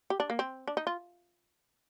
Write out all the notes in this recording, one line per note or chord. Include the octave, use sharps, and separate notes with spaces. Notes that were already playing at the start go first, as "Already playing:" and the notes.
G4
D4
A#3
C4
D4
D#4
F4